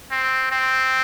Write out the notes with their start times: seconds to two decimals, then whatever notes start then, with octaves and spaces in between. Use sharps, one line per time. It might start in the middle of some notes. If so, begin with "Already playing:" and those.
0.11 C4
0.51 C4